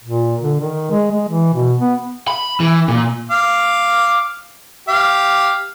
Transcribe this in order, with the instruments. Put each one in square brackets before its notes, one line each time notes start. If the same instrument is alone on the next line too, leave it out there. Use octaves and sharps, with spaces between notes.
[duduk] A#2
D3
D#3
G#3
G#3
E3
B2
B3
[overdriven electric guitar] B5
E3
A#2
[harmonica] F5 D6
G4 F5